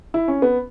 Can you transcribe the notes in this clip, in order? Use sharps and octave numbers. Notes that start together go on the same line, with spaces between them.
E4
C#4
B3